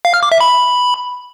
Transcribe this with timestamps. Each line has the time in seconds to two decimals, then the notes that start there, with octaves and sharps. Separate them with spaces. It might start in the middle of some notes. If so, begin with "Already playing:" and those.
0.05 F5
0.14 F6
0.23 D6
0.32 E5
0.41 B5